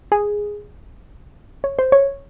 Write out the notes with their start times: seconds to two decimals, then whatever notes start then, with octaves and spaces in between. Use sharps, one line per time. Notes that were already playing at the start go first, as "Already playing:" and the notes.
0.12 G#4
1.64 C#5
1.79 C5
1.92 C#5